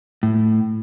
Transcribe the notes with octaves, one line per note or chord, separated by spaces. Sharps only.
A2